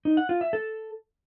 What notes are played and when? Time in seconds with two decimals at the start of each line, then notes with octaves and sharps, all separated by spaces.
0.05 D#4
0.17 F#5
0.29 F4
0.41 E5
0.53 A4